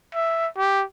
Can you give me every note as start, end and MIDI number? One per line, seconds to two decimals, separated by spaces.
0.15 0.47 76
0.58 0.84 67